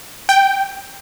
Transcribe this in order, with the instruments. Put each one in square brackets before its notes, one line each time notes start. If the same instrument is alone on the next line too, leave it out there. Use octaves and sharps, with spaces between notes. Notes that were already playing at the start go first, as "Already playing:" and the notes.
[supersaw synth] G5